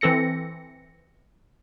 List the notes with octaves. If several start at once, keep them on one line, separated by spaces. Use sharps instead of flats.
E3 C4 A4 A#6 C#7